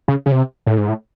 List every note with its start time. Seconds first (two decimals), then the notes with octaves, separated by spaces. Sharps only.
0.08 C#3
0.26 C#3
0.32 C3
0.66 A2
0.78 G#2
0.89 A2